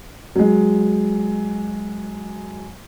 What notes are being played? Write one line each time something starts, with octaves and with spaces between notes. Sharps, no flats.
F#3 G#3